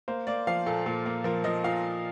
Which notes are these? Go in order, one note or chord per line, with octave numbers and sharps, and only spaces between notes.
A#3 C5
A#3 D5
F3 F5
A#2 A4
A#2 A4
A#3
F3 A#4
F3 D#5
A#2 F5